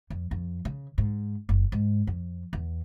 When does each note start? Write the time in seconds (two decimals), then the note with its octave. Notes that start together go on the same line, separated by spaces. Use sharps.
0.10 F2
0.31 F2
0.65 C#3
0.98 G#2
1.49 F#1
1.72 G#2
2.07 F2
2.53 E2